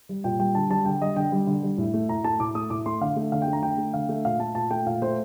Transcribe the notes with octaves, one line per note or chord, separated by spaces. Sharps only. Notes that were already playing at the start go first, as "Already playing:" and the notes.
G3
A#2 G5
G3 G5
D3 A5
G3 A5
D3 G5
G3 D#5
D3 G5
G3
D3
G3
A2
A3
A2 A#5
A3 A5
A2 D6
A3 D#6
A2 D6
A3 C6
D3 F5
A3
D3 F5
G5
A3
A#5
D3 G5
A3
D3 F5
A3
A#2 F5
A3 A5
A#2 A5
A3 G5
A#2 F5
A3 C5